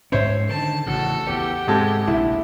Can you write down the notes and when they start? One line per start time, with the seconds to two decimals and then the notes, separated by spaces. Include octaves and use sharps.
0.12 G#2 C#4 C5 C#5 E5
0.49 D3 D#3 A5
0.86 A1 C#3 F#4 A4
1.29 E2 E3 G4 F#5
1.67 G#2 C3 G#3 A4
2.08 F1 A#1 D#2 E4